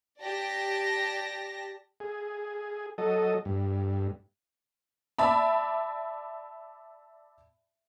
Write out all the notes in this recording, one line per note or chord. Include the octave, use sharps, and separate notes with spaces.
G4 D5 A5 A#6
G#4
F#3 A4 D#5
G2
D5 E5 A5 B5